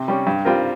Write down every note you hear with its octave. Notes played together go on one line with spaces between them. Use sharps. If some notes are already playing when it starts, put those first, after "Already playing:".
Already playing: C3
G3 C#4
G2
G3 C4 F4 A#4